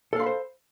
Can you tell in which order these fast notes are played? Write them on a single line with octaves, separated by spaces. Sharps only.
A4 F5 C6 B5 C5